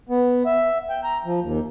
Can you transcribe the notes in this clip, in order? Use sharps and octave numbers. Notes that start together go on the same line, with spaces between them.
B3
E5
G5
A#5
F3
D#2